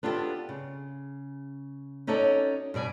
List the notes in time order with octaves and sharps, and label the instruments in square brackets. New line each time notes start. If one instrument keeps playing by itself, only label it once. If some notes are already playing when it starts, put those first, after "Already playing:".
[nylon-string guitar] B3 D4 F4 G4 A4
C#3
C#4 D#4 F#4 A4 C#5 D5
G2 B2 D5 G#5